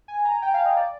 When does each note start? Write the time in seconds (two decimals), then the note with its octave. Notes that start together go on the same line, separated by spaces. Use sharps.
0.08 G#5
0.25 A#5
0.42 G5
0.54 F5
0.65 D#5
0.77 D5